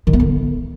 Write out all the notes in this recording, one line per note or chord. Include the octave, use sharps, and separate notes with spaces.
D#3
B3
D3